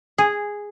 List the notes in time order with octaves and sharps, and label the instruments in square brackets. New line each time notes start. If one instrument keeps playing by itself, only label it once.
[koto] G#4